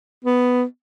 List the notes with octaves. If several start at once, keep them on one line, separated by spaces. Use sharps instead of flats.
B3